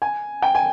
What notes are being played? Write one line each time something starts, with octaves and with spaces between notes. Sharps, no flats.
G#5
G5
G#5